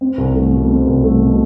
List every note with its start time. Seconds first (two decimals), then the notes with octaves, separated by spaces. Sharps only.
0.01 C4
0.18 C2
0.35 A3
0.52 B2
0.70 C4
0.87 C2
1.04 A3
1.21 B2